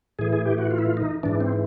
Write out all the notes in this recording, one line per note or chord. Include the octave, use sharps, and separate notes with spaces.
A2 E3 G#4
G#4
G4
F#4
F4
E4
F4
D#4
G#2 E3 D4
C4